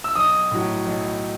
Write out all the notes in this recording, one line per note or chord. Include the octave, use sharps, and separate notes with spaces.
E6
B1 D#6
A2 F#3
B1